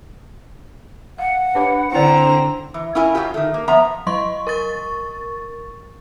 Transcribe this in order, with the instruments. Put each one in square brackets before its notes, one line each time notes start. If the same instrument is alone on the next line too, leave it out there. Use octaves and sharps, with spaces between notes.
[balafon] F5 [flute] F#5
[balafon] D4 G4 C#5 [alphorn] B4
[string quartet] D3 A#5 [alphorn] C4 [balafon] E4 D5
[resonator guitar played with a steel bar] E3
C#4 E4 F4 A#4 G#5
F#2 A#2 F#3 F4 G4
D#3 A3
A#3
F3 B3 E5 A#5
[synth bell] F#3 D#5 C6 C#6
A#4 C#6 A6